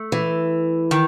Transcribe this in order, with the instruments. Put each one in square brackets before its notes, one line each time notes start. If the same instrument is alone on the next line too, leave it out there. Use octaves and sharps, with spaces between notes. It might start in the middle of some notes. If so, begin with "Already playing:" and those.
Already playing: [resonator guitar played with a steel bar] A3
[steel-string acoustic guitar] E3
[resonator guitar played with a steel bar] D#3